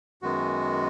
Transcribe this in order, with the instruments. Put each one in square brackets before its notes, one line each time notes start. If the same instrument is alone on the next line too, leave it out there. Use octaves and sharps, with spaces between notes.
[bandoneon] F#2 D#3 G#3 B3 F#4